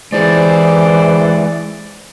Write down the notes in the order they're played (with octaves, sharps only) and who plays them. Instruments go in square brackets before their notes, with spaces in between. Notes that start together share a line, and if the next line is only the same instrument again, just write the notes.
[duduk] E3 [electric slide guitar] G#3 E4 G4 [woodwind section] G#4 C5 D5